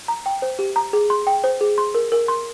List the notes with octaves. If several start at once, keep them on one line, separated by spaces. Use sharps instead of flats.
A#5
G5
C5
G4
A#5
G#4
C6
G5
C5
G#4
C6
A#4
A#4
C6